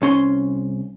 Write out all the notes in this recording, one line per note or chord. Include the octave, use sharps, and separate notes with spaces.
C2 C#4 C6